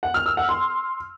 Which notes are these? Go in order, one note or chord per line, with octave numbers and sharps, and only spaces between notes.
F#5
F6
E6
F#5
C6